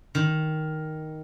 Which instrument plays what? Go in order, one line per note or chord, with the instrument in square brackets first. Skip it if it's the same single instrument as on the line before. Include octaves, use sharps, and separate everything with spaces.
[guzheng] D#3